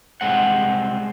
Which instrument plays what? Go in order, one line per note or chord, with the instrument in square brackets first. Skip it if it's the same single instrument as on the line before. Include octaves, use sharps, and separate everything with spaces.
[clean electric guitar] C2 E3 G#3 C4 F#5